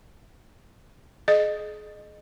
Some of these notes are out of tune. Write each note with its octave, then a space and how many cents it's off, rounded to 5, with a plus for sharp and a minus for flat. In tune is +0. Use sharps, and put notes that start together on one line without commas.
G#4 +35 D#5 -20